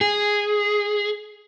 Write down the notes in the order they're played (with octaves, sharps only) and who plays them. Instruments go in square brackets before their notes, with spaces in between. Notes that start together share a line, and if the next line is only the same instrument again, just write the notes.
[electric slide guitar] G#4